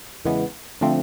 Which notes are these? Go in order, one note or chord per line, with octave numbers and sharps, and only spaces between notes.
E2 C#3 E3 G#3 B3
D3 F3 A3 C4